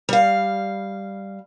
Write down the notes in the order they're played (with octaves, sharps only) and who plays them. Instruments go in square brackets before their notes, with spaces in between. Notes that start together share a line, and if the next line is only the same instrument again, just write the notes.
[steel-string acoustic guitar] G3 F5